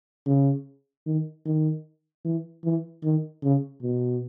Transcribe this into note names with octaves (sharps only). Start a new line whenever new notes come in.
C#3
D#3
D#3
E3
E3
D#3
C#3
B2